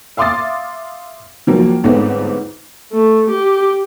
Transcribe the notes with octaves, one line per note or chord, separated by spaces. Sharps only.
E5 F5 C6 D6 D#6 A6
D#3 F3 F#3 A#3
G1 G#2 A3 B3 C4 D#4
A3
G4